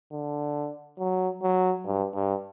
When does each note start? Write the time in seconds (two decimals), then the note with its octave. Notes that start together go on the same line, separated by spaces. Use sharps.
0.12 D3
0.99 F#3
1.43 F#3
1.85 G2
2.14 G2